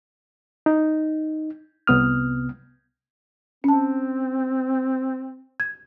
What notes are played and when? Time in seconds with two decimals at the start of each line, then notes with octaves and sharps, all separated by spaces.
0.66 D#4
1.87 C2 C3 B3 D#6 F6
3.64 C4 C#4 A5
5.60 G#6